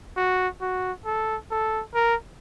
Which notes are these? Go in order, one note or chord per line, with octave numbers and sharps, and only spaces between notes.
F#4
F#4
A4
A4
A#4